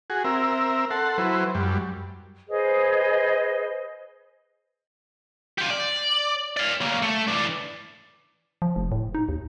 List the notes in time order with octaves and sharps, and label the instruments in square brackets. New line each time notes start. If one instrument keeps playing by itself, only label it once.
[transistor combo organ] F#4 G#4
C4 A#4 E5
A4 F#5 C6
F#3 E4 B4 C5
F#2 G3
[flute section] G#4 B4 C5 D#5
[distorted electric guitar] F4 G4
D5
D5 F5
A#3 C#4
A3
E3 D4
[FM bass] F3
F1
A2
D#4
D#2